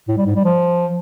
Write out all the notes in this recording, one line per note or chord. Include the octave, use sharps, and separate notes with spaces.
A2
G3
G#2
G3
F3